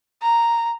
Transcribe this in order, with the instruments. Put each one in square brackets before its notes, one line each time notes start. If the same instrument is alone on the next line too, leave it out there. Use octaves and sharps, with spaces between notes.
[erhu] A#5